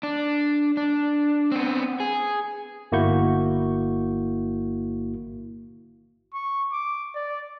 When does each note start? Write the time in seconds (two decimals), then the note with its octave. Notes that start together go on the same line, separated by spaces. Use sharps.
0.03 D4
0.77 D4
1.52 B3 C4
2.00 G#4
2.92 G1 A#3 E4 F#4 C#6 G6
6.33 C#6
6.72 D6
7.15 D5